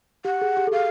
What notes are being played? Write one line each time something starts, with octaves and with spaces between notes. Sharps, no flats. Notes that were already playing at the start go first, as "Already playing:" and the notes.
G4 F#5
G#4
G4
A4
G#4 F5